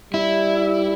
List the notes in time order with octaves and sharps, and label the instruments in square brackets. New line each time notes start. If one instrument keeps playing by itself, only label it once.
[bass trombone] G3 [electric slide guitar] E4